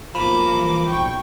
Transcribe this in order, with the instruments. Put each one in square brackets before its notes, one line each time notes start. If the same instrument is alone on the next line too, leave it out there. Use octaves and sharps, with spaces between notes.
[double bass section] B1 [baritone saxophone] F3 [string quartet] A#3 D6 [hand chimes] B5
[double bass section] C2 E3
[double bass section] F#1 B1 A#2 [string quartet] G5 C#6